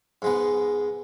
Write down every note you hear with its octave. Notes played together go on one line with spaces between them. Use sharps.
G#2 G#3 B3